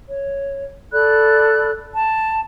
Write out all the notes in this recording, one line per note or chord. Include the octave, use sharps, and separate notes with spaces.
C#5
A4 D5 B5 F#6
A5